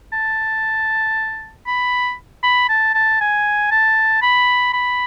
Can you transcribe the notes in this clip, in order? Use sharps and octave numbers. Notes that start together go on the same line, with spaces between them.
A5
B5
B5
A5
A5
G#5
A5
B5
B5